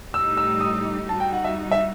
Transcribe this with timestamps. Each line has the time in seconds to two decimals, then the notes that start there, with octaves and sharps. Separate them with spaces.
0.14 A2 G3 D#4 G4 E6
0.37 E6
0.60 D#6
1.08 G3 D#4 F#4 A5
1.20 G5
1.33 F#5
1.44 E5
1.71 E5